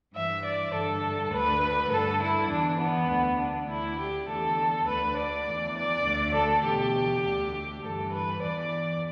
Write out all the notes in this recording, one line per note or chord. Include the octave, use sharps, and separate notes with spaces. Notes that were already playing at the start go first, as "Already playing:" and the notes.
G2 E3 E5
D5
G2 D3 A4
D2 D3 B4
G2 D3 A4
E4
E2 E3 D4
B3
D2 D3
D4
D2 D3 E4
G4
E2 D3 A4
D2 D3 B4
D5
E2 E3
D5
D2 D3
A4
E2 B2 G4
D2 D3
G2 E3 A4
B4
E2 E3 D5